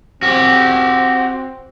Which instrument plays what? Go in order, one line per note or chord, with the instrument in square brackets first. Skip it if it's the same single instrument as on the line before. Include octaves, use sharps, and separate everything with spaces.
[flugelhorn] C4 [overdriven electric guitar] F#4 G4